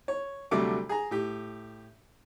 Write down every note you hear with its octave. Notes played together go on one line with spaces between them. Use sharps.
C#5
D2 C3 F#3 G3 A3 D6
G#4 A#5
A2 G4